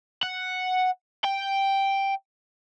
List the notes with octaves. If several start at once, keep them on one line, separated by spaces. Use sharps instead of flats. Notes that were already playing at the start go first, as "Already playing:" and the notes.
F#5
G5